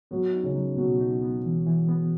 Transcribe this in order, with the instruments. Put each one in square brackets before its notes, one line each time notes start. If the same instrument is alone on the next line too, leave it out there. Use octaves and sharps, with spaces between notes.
[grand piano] F#3 [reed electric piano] B3
[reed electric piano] D#4
[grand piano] C#3
[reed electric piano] F#3
[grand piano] B2 [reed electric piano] F#3
[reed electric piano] D#4
B3
E3
E3
B3